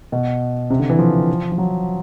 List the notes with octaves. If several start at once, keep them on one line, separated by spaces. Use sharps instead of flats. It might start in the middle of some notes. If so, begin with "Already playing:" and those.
B2
C3
D3
E3
F3
F3
F#3